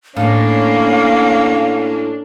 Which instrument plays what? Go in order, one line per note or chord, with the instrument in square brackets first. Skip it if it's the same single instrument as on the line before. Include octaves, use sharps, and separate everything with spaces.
[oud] A2 [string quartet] A#3 C#4 [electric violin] D4 [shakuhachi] F5